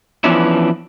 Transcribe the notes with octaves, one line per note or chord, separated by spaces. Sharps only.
E3 F3 B3 C#4 D4 E4